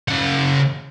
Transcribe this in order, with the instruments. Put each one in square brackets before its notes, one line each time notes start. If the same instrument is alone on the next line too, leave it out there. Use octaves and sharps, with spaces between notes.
[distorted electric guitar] C#3 F#5